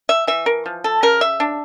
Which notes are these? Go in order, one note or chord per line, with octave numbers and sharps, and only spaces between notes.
E5
E3 E5
A#4
F3
A4
C#3 A#4
E5
D4